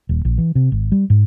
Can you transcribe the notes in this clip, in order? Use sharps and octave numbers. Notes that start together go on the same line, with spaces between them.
D#1
A#1
E3
C3
G#1
G3
G#2